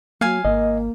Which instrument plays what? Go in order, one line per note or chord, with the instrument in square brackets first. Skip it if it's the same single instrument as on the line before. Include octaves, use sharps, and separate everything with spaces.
[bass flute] F#3 [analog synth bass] A#3 [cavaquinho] F5 G#5
[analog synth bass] G#1 [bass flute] A#3 [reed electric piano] D#5